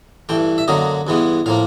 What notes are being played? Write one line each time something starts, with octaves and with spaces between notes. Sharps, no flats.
G2 E3 A3 G5
E5
F#2 D3 F#3 A#3 D#5
G2 E3 G#3 B3
A2 F3 A#3 F5